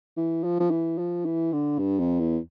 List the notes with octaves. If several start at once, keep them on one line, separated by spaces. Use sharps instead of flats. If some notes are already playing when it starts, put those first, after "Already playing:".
E3
F3
F3
E3
F3
E3
D3
G2
F2
E2